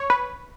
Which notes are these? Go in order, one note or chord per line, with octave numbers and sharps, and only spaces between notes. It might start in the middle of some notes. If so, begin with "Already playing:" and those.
Already playing: C#5
B4